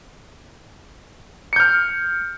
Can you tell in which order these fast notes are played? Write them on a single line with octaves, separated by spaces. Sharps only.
C#7 G6 F6